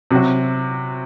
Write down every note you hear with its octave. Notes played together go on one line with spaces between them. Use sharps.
C3 F#3 C4 F#4